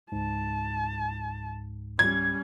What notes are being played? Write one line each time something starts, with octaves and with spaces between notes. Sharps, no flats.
C#2 G#2 A5
G3 C#4 G#6